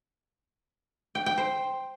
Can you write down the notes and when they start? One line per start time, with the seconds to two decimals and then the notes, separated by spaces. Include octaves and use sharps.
1.15 G5
1.26 G5
1.38 C5